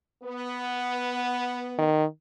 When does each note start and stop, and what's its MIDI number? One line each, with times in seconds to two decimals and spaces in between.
0.23 1.91 59
1.78 2.05 51